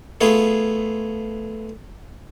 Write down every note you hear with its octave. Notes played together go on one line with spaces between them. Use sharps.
A3 B3 F4 G#4